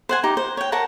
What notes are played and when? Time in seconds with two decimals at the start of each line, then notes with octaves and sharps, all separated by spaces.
0.09 C5 F#5 G#5
0.24 D#4 G4
0.37 C5
0.57 C#5 G5
0.72 A#4 F#5 A5 A#5